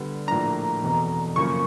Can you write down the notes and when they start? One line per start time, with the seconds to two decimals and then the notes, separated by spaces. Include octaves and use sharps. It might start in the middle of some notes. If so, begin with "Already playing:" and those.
Already playing: D3 G3 B3
0.27 A#1 A2 F3 A#3 D4 A#5
0.81 F1 E2 B2
1.36 F#2 C#3 F3 A#3 C#4 C#6